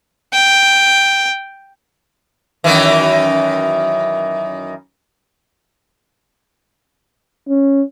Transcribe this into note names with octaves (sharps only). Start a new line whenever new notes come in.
G5
F#2 D#3 E3
C#4